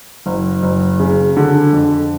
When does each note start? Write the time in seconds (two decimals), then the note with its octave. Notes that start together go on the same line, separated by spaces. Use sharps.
0.26 F#1
0.63 F#1
0.99 C#3
1.37 D3
1.73 F2